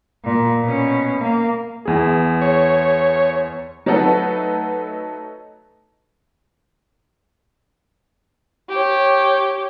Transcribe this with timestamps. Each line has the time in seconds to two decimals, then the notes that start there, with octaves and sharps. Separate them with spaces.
0.24 A#2
0.61 B2 C#4
1.20 A#3
1.85 E2 G#4
2.41 C#5
3.86 F#3 A3 D#4 F#4 A4 B4
8.69 G4 C#5